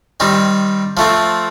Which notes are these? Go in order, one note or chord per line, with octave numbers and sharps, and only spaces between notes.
D#3 G3 C4
F3 A3 C4